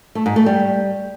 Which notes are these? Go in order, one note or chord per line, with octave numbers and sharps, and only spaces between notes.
A3
G#2
A3
G3